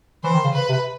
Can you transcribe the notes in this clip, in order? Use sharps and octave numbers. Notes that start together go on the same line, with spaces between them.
E3 C5
D#3
C#3
C#3 B4
C3